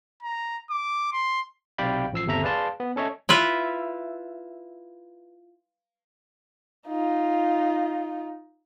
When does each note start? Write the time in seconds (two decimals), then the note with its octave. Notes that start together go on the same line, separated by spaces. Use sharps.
0.23 A#5
0.70 D6
1.13 C6
1.78 B1 C3 D5 F5 G5 B5
2.13 A1 F3 E6 C7
2.26 G1 D#2 C3 A4 E5 A#5
2.43 G#4 B4 D5 F5 A5 C6
2.80 B3
2.96 C#4 A4 C#5 D#5 E5
3.29 E4 F4 B4 E5
6.87 D#4 F4